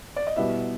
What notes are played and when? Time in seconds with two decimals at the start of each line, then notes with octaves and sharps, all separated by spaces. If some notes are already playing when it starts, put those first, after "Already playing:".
0.16 D5
0.27 D#5
0.36 B2 G3 B3 E4 E5